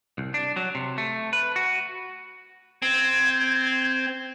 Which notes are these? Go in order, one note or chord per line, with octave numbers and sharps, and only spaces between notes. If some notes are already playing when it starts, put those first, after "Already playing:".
C2
D4
F#3
C3
A3
B4
F#4
C4 G#6